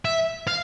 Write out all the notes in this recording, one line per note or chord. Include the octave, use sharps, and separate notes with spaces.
E5
F5